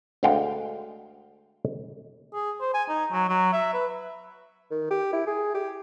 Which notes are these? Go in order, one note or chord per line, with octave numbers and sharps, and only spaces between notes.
D2 D3 G#3 F5 G5
G#4
C5
G#5
D#4
F#3
F#3
E5
B4
D#3
G4
E4
G#4
G4